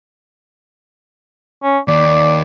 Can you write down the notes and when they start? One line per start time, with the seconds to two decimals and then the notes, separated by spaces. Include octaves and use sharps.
1.63 C#4
1.88 D#2 D5